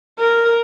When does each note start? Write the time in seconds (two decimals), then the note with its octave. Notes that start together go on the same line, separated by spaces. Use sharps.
0.19 A#4